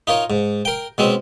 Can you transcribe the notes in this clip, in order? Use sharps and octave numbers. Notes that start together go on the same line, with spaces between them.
D#4 F4 A#4 C#5
G#2
A#4 G5
B2 G#3 C4 C#4